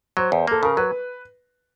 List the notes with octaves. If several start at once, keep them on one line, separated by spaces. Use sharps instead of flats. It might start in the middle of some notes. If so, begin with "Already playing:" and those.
F#3 C5
E2
A#3 A4
C#3 A#4
F#3 B4